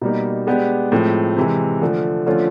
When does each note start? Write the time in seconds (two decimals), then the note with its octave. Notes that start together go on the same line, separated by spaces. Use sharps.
0.02 B2 G3 A#3 D#4
0.47 G#3 B3 D4 G4
0.92 A2 F3 G#3 C4
1.37 C3 E3 G#3
1.82 D3 F3 A3
2.26 D3 F3 A3 C#4 F4